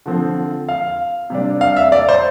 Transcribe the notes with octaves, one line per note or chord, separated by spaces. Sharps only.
D3 F3 C4
F5
C3 G3 D4
F5
E5
D5
C5